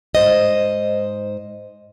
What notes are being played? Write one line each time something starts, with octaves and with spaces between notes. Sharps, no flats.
G#2 C5 D#5